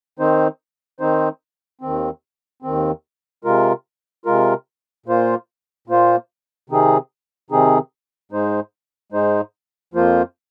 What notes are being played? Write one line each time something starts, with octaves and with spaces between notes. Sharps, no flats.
D#3 C4 D#4 C5
D#3 C4 D#4 C5
D#2 D#3 C4
D#2 D#3 C4
C3 G#3 F4 A#4
C3 G#3 F4 A#4
A#2 A#3 F4 C5
A#2 A#3 F4 C5
C3 D#3 C4 D#4 G#4
C3 D#3 C4 D#4 G#4
G#2 G#3 D#4 C5
G#2 G#3 D#4 C5
F2 F3 A#3 F4 C5